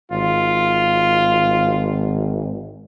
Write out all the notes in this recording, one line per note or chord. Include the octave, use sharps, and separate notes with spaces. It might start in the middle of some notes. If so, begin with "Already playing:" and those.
G#1 F4